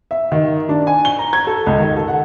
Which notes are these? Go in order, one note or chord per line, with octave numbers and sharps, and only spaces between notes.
E5
D#3
D4
G#5
G7
A#5
G#6
A4
C#2
D#3
A4
F#5